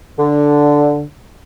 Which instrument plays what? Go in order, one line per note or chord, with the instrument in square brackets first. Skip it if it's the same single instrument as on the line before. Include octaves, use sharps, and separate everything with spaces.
[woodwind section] D3